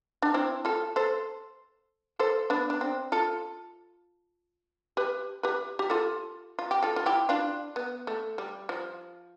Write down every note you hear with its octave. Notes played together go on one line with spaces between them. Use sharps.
D4
C4 E4
F4 A4
A4 C5
A4 C5
B3 D4
D4
C4
F4 A4
G4 B4
G4 B4
G4
F4 A4
F4
G4
F4 A4
F4
E4 G4
D4 F4
B3
A3
G3
F3